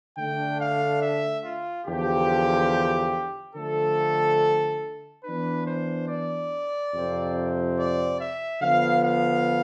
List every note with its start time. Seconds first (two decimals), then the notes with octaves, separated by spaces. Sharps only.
0.17 D3 A3 D4 G5
0.59 F5
1.02 E5
1.43 F4
1.86 E2 D3 F3 G4
3.55 D3 F3 A3 A4
5.24 E3 B3 D4 B4
5.65 C5
6.08 D5
6.93 F2 C3 F3 C4
7.77 D5
8.19 E5
8.61 D3 F3 B3 F5
9.03 F5